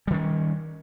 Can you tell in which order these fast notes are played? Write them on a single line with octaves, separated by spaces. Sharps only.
G3 D#3 C#4